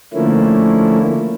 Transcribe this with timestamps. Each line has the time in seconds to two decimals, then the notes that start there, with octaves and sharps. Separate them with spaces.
0.13 D3 F3 A3 A#3 C#4 E4